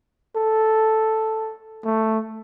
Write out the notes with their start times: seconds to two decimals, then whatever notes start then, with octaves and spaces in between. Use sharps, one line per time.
0.36 A4
1.85 A3